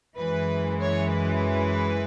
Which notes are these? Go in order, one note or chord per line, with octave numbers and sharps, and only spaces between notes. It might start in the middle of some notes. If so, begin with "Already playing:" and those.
F#2 E3 G#3 B4
C#5
B4